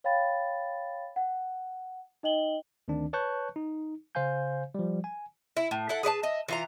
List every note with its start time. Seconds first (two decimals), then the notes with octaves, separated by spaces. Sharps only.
0.04 C#5 F5 G5 B5 A6
1.16 F#5
2.23 D#4 D#5 G5 F#7 G7
2.88 D2 D#3 C4 D4
3.13 B4 C#5 A5 C#6 F#6 G6
3.56 D#4
4.15 C#3 C5 F5 G#5 G6
4.75 F3 G3
5.04 G#5
5.56 E4
5.71 A2
5.89 E4 A4 F#5
6.03 G#4 B4 D5 A5
6.23 D#5 E5
6.48 E3 F4 A#5